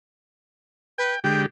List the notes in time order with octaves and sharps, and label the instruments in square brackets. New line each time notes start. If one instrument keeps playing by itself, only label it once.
[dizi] B4 [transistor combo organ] G5
[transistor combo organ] D3 G#3 G4 [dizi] G5